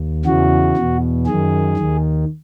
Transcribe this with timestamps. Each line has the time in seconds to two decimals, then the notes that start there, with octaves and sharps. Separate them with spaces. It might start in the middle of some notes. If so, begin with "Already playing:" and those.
Already playing: D#2
0.25 E2 C#3 E3 F#4
0.76 E2 B2
1.26 F#2 D#3 G#4
1.77 D#2 D#3